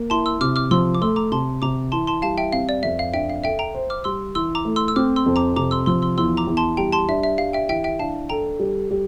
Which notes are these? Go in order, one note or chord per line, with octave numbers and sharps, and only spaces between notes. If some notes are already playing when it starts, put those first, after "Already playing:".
Already playing: A#3
E4 A5 C6
C6 E6
C3 D6 F6
D6 F6
F3 C6 E6
D6
A3 C6 E6
A#5 D6
C3 A5 C6
C3 A#5 D6
E3 A5 C6
A5 C6
G3 F5 A5
E5 G5
C4 F5
D5
F2 E5
F5
D4 E5 G5
F5
A4 E5 G5
G5 A#5
C5
D6 F6
G3 C6 E6
E3 C6 E6
A#5 D6
A3
C6 E6
E6
C4 D6 F6
C6 E6
F2
A#5 D6
C3 A#5 D6
C6 E6
F3 C6 E6
C6 E6
E2 C6 E6
A#5 D6
E2
A5 C6
G3 G5 A#5
A5 C6
D4 E5
E5
G4 F5
E5 G5
E3 E5 G5
E5 G5
D4 F5 A5
A4 G5 A#5
G3
G3